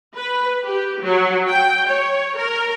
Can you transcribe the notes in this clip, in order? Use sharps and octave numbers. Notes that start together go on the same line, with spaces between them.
B4
G4
F#3
G5
C#5
A#4